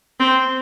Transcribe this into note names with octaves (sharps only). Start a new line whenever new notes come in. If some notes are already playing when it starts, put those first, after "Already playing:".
C4